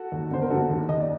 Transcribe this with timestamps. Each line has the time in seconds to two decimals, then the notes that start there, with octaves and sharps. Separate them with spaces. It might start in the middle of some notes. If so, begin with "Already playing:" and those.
Already playing: F#4 A4
0.12 D#2
0.31 D3 C5
0.42 A#4
0.50 D3 F#4 A4
0.69 D#2
0.89 D#2 D#5
1.00 D5